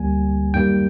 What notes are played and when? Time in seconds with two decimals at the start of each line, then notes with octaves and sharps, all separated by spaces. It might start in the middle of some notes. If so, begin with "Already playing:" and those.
Already playing: D2 D3 G3 A#3 G#5
0.54 F#2 D#3 G3 A#3 G5